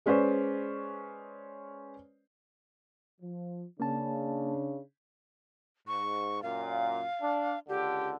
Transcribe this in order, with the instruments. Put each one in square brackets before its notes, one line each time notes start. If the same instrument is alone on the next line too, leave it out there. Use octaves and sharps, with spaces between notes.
[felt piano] G#3 C#4 B4 C5 D5
[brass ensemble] F3
[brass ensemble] C#3 D4 [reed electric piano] A#3 C#4 A5
[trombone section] G#2 [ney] C#6
[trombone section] F#2 A#2 [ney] F5
[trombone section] D4
[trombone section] C#2 D3 [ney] G4